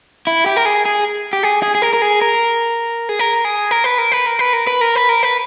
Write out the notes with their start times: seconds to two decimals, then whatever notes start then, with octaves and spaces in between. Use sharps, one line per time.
0.27 E4
0.46 G4
0.56 A#4
0.65 G#4
0.85 G#4
1.33 G4
1.43 G#4
1.63 G#4
1.75 G#4
1.82 A#4
1.93 A#4
2.02 G#4
2.22 A#4
3.09 G#4
3.19 A#4
3.45 G#4
3.71 A#4
3.84 B4
3.98 A#4
4.12 B4
4.26 A#4
4.39 B4
4.53 A#4
4.67 B4
4.81 A#4
4.95 B4
5.09 A#4
5.23 B4